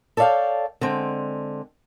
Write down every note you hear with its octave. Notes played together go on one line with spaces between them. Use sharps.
A4 C#5 D5 E5 F5 G5
D3 G#3 C4